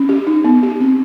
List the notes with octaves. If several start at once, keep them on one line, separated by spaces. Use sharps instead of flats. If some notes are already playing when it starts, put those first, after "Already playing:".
Already playing: C#4
G4
D#4
B3
G4
C4